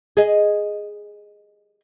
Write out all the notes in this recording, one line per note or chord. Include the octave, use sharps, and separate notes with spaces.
G#4 D#5